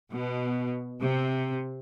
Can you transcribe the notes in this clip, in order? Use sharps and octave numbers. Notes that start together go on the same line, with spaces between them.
B2
C3